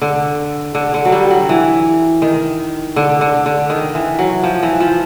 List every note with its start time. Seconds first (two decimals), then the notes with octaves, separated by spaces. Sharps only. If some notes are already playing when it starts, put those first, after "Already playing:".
0.02 D3
0.75 D3
0.94 D3
1.05 F#3
1.12 G3
1.31 F#3
1.49 E3
2.22 D#3
2.96 D3
3.21 D3
3.46 D3
3.70 D#3
3.95 E3
4.19 F#3
4.44 F3
4.63 E3
4.80 F3